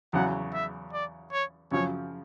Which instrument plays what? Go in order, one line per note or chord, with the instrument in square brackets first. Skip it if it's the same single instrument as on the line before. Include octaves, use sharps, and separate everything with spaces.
[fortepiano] E2 C#3 F#3 [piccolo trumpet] F#5
[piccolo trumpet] E5
D5
C#5
[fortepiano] F#2 C#3 F3 [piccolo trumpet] C#5